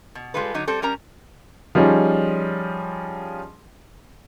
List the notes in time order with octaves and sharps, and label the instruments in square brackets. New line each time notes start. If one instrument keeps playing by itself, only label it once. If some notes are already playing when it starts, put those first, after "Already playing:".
[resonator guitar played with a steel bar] B2
G3 G#3 D#4 F4 A4 B4
D3 F#3 D#4
G3 C4 A4
G3 C#4 A#4 A#5
[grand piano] F3 G3 C#4 D#4 G#4